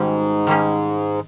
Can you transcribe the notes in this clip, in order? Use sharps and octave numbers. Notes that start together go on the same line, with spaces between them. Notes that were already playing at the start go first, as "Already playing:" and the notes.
Already playing: G#2 D#3 G3 C#4 F#4
D#3 G3 A#3 C#4